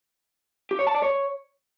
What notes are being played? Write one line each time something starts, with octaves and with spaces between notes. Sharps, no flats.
G4
C#5
A5
D5
C#5